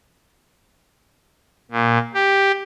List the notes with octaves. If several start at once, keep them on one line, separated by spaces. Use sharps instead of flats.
A#2
G4